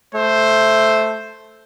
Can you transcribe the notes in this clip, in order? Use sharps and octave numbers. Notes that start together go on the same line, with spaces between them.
A3 C5